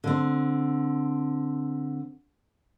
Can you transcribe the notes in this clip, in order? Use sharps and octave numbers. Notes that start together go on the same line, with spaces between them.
D3 C4